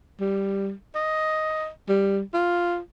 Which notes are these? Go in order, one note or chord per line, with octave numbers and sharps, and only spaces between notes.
G3
D#5
G3
F4